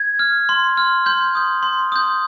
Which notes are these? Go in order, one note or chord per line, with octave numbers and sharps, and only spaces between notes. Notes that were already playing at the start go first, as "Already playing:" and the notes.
Already playing: G#6
F6
C6
F6
C6 G6
D#6 G6
C6
D#6 G6